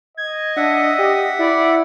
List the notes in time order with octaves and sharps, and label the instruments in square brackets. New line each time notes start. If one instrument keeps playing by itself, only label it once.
[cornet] D#5 [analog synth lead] G#6
[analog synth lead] D4 [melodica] E5 F#5
[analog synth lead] G4
[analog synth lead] E4 [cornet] D5